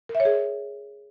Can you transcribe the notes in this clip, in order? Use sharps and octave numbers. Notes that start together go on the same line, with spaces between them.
A#4
E5
C#5
G#4